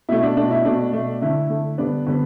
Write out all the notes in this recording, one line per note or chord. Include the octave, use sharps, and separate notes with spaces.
B2 A3 E4
D4
B2 A3 D4
E4
B2 A3 D4
B2 A3
D3 A3 E4
D3 A3
D3 G3 B3 D4
D3 G3 B3